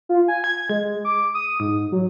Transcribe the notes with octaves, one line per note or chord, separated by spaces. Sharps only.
F4
G#5
G#6
G#3
D6
D#6
G#2
F#3